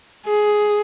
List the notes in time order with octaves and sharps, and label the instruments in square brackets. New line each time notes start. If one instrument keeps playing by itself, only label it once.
[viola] G#4